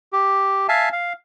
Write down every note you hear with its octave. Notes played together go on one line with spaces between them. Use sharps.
G4
E5 F5 G#5 A5
F5